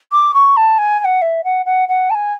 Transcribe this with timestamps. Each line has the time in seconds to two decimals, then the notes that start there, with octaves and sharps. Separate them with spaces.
0.12 D6
0.34 C#6
0.57 A5
0.78 G#5
1.00 G#5
1.04 F#5
1.22 E5
1.44 F#5
1.66 F#5
1.88 F#5
2.10 A5
2.15 G#5